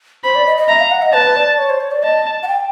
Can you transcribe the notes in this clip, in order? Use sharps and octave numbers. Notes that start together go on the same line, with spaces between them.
C5 B5
D5
D#5
D#5
E5 A#5
F5
F#5
D#5
B4 A5
D5
C#5
C5
C#5
D5
D#5 A5
F#5
G5